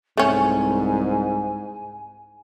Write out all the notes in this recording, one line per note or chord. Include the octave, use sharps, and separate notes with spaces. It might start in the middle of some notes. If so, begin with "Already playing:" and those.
C2 G#2 A3 C#4 G#5